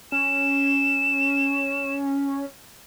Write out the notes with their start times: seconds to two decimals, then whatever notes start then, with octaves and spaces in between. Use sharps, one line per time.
0.12 C#4 E7